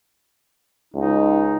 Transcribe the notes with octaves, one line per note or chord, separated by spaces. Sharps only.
C#2 D#4